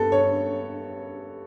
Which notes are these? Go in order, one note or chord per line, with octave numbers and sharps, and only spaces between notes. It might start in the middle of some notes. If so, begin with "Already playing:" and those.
Already playing: G2 B3 A4
C#5